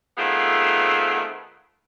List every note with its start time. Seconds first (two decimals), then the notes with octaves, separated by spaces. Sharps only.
0.17 D#3 A3 B3 C4 F4 G#4